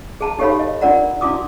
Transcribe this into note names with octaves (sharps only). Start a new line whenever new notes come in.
G#4 A5 A#5
D#4 G4 A4 C#5 F5 B5
D#5
D4 F4 A#4 D5 F#5 A#5
D4 E4 F#4 D6 D#6